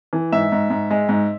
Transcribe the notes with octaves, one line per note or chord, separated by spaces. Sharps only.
E3
G#2 E5
G#2
G#2
G#3
G#2